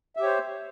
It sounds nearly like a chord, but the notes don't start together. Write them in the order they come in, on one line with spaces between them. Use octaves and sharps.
E5 G4 C#5 C5